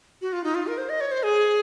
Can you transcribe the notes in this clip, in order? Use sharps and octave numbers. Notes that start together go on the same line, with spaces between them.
F#4
F4
D#4
F4
A#4
C5
D#5
C#5
C5
G#4